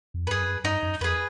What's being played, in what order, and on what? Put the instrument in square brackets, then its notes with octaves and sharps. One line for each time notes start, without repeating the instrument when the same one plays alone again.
[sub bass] F2
[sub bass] G2 [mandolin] G#4 B4
[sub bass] F#2
[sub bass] G2 [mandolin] D#4
[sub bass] F#2
[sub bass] F2 [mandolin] G#4 B4